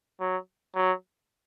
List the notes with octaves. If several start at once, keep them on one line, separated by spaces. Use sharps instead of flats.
F#3
F#3